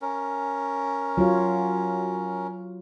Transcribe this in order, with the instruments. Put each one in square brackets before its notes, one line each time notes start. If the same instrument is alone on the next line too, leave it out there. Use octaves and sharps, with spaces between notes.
[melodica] C#4 A#4
[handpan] F#3 F4 C#5